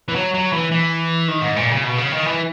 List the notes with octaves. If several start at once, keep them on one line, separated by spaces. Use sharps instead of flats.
E3
F#3
F#3
E3
E3
D#3
G#2
A#2
C#3
B2
C#3
D#3
E3